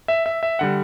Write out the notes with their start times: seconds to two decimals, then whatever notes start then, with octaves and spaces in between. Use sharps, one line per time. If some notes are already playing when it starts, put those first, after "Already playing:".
0.08 E5
0.26 E5
0.43 E5
0.59 D3 G3 F#5